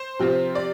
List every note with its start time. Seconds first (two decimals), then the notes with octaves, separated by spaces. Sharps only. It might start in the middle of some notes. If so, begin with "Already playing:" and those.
Already playing: C5
0.19 C3 F3 C4 F4
0.55 D5